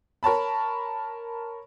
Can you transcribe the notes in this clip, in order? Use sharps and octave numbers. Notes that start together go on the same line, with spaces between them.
A#4 C#5 A5 B5